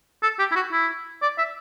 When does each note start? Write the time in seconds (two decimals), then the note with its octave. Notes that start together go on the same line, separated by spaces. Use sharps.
0.23 A4
0.39 G4
0.51 E4
0.55 F#4
0.72 E4
1.22 D5
1.38 E5